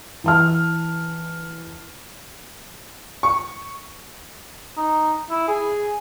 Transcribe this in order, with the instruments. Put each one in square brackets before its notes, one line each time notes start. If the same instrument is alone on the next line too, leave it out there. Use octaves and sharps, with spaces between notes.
[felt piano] E3 A5 F6
[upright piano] C#6
[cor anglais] D#4
E4
G#4